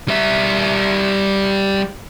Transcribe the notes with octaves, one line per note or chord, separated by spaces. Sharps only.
G3 E5